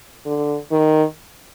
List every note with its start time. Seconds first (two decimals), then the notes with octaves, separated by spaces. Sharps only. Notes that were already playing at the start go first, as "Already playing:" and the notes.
0.26 D3
0.72 D#3